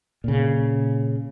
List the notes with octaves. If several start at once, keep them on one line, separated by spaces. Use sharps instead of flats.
A#2 C#3